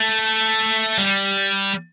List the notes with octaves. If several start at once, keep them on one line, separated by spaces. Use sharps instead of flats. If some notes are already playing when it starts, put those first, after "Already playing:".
Already playing: A3
G3